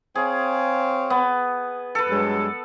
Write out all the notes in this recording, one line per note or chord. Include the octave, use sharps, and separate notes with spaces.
C4 G#4 C#5 F5
B3
A4 B4
G2 F#3 G#3